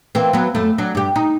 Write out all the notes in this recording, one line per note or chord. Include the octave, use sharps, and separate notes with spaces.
E3 A#3 C4
F#3 B3
F#2 A3
F#3 D4
G2 G4
D#4